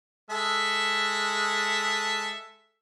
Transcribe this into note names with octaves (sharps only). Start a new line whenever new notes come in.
G#3 A4 E5